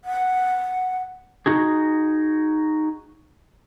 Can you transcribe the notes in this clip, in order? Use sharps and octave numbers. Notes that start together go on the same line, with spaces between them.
F#5
D#4 F#4 G#4